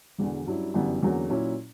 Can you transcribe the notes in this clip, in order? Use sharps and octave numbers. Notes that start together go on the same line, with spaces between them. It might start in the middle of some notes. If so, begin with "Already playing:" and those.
E1 E2 D3
G2 F#3 C#4 E4
G1 F#2 E3 G3 B3
E2 D3 F#3 A#3 C#4
A#2 F#3 C#4 E4